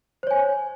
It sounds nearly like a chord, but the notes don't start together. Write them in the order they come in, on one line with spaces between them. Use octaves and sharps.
C5 C#5 G#5